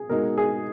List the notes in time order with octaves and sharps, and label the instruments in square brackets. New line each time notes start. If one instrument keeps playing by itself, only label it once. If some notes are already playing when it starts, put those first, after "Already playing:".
Already playing: [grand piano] G#4
[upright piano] B2 G#3 D#4 [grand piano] A#4
[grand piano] G#4